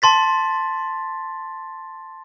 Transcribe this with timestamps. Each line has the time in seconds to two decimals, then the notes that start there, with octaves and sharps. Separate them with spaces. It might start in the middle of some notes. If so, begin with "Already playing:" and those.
0.02 A5 C6 A6 B6